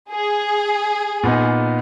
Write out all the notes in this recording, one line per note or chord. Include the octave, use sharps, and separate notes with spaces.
G#4
A#2 B3 D#4